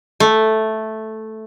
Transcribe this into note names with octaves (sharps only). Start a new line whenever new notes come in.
A3